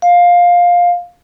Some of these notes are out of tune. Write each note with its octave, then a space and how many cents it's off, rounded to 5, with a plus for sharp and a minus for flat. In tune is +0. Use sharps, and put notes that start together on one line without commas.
F5 +15